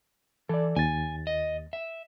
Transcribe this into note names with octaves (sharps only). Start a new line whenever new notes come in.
E3 A4 D5
D#2 G#5 A6
D#5
E5